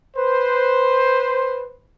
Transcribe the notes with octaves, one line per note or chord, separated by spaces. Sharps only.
B4 C5